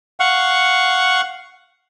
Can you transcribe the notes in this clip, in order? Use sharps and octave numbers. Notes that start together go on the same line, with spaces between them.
F5 F#5 C#6